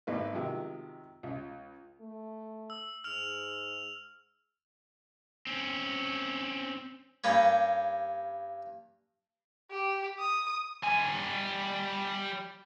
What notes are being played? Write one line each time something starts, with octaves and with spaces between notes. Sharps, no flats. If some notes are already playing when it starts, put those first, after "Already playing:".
G#1 A3 D#4 B4
C3 D#3 F3 F#3 G#3
C#2
A3
E6
G#2 F6 F7
C4 C#4
G2 G3 A#3 C#4
G4
D#6
G3 G#5